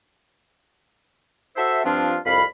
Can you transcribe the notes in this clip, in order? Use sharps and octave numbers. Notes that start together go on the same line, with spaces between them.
F#4 A4 C5 E5
G2 F3 C4 D4 F4
C2 F2 F5 B5